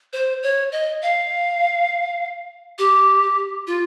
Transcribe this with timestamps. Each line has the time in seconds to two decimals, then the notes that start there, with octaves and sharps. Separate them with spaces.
0.13 C5
0.43 C#5
0.72 D#5
1.02 F5
2.78 G4
3.67 F4